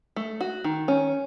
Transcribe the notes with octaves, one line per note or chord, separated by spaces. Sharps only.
A3
F#4
D#3
C#4